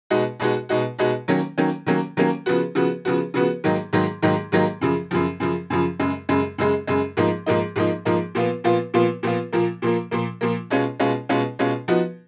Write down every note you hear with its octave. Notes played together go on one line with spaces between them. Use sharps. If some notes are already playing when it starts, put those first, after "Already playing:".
B2 G#3 D#4 F#4
B2 G#3 D#4 F#4
B2 G#3 D#4 F#4
B2 G#3 D#4 F#4
D#3 F#3 A#3 C#4
D#3 F#3 A#3 C#4
D#3 F#3 A#3 C#4
D#3 F#3 A#3 C#4
C#3 F3 B3 F#4
C#3 F3 B3 F#4
C#3 F3 B3 F#4
C#3 F3 B3 F#4
G#2 D#3 F#3 A#3 D#4
G#2 D#3 F#3 A#3 D#4
G#2 D#3 F#3 A#3 D#4
G#2 D#3 F#3 A#3 D#4
F#2 C#3 F3
F#2 C#3 F3
F#2 C#3 F3
F#2 C#3 F3
F#2 C#3 G#3
F#2 C#3 G#3
F#2 C#3 G#3
F#2 C#3 G#3
G#2 F3 A#3 D#4
G#2 F3 A#3 D#4
G#2 F3 A#3 D#4
G#2 F3 A#3 D#4
A#2 F3 B3 F4
A#2 F3 B3 F4
A#2 F3 B3 F4
A#2 F3 B3 F4
A#2 F3 A#3
A#2 F3 A#3
A#2 F3 A#3
A#2 F3 A#3
B2 G#3 C#4 F4
B2 G#3 C#4 F4
B2 G#3 C#4 F4
B2 G#3 C#4 F4
F3 B3 D#4 F#4